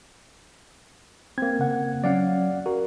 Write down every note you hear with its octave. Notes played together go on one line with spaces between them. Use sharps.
A#3 C4 G#6
C#3 F#5
F#3 C#4 D5 F5 F#5
F#4 A#4